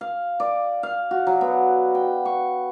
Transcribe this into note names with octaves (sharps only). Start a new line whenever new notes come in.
F5
D5
F5
F#4
F#3
B3
G5
C#6